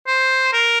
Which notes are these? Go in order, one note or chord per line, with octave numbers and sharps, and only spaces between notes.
C5
A#4